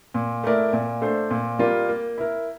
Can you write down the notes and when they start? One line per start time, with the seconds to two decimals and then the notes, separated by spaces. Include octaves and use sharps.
0.14 A#2
0.44 A3 E4 A#4 D5
0.73 A#2
1.01 A3 D4 A4 C5
1.31 A#2
1.59 G3 A#3 F4 A#4
1.89 A#3
2.18 E4 A#4